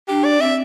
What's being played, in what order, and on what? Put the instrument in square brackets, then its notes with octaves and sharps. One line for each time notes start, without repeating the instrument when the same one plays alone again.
[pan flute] D4 [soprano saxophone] G4
[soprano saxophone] D5
[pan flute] C4 [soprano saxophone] E5